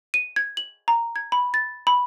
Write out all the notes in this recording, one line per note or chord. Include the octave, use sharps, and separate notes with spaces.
D#7
G#6
F#7
A#5
G#6
B5
A6
B5